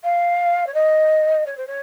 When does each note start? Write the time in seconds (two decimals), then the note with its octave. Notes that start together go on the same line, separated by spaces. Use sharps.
0.04 F5
0.67 C#5
0.74 D#5
1.46 C#5
1.57 C5
1.67 C#5